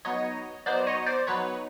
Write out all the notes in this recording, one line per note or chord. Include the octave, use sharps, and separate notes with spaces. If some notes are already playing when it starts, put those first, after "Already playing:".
F#3 B3 D#4 C#5 D#5
F#3 B3 D#4 C5 D5
C#5 D#5
C5 D5
F#3 B3 D#4 B4 C#5